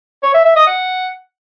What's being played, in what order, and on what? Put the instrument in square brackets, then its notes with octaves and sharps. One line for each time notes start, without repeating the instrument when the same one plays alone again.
[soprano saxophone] C#5
E5
E5
D#5
F#5